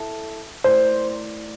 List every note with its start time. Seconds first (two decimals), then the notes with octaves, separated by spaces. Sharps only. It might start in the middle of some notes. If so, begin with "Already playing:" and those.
Already playing: E4 A4 E5 A5
0.64 A3 E4 A#4 C5 D5